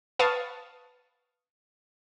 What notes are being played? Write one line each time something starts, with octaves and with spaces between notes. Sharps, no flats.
B4 F5 A5 C#6 D#6 A6